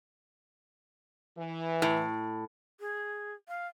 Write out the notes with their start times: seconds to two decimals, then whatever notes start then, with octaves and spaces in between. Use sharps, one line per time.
1.38 E3
1.82 A2
2.80 G#4
3.48 F5